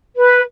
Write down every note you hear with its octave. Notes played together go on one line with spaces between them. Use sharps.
B4